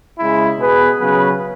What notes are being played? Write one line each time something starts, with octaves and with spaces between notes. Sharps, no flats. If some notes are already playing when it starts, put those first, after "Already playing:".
C#3 G#3 E4
B2 B3 G#4 B4
C#3 F#3 B3 G#4 B4